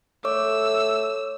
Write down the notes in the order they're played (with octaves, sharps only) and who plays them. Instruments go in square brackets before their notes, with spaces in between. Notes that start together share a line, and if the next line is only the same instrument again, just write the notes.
[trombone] A3 [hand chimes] C#5 D6 [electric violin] E6